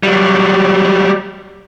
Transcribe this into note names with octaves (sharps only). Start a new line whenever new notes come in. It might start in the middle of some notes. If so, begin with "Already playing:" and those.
F#3 G3